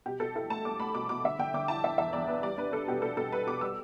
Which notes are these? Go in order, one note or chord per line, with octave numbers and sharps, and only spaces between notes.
B2 G4
B2 A4
E4 A4
A3 A5
A3 D6
A3 B5
B2 D6
B2 D6
D3 E5
D3 G5
D3 D6
E4 A5
E4 E5
E2 E5
E2 D5
B3 B4
G3 D5
D4 B4
D4 A4
B2 G4
B2 A4
B2 A4
G3 B4
B2 D6
G3 E6